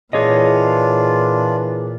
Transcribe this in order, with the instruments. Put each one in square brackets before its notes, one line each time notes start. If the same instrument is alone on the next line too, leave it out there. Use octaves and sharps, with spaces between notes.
[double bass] A#2 [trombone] E3 [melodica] D4 F4 [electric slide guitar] G#4 C#5 D#5